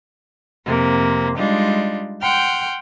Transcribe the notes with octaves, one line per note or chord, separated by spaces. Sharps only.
F2 C3 A#3
G3 G#3 D4 D#4 F4
F#5 G5 C6 F6 G6